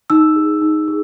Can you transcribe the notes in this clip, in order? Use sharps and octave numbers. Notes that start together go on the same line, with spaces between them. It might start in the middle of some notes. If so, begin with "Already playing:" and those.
D#4 E6
G#4
D#4
G#4